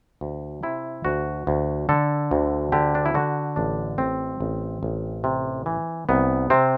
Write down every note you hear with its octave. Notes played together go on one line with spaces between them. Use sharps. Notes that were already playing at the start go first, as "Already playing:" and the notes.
D2
C3 E4
D2 F#4
D2
D3 A4
D2
D3 G4
D4
E4
D3 F#4
A1 D4
A1 C4
A1
A1
C3
E3
C2 B3
C3 C4